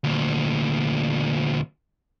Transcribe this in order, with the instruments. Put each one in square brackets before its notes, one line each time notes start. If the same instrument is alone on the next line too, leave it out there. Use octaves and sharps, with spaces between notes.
[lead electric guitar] D2 A#2